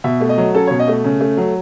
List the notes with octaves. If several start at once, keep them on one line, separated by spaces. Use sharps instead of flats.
B2 E5
A3
D#5
F#3
C#4 A4
B2 C#5
D#5
A3
C#3
A3
F#3